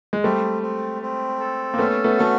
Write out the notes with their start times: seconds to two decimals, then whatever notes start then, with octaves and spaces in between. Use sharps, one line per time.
0.13 G#3
0.24 G3 A3 C4
0.62 C4
1.02 C4
1.40 A4
1.74 A#3
1.78 A3 B3 C#4
2.04 A3 B3
2.18 A3 F#4